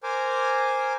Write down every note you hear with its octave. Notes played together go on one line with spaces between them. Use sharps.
A#4 C5 G#5 D6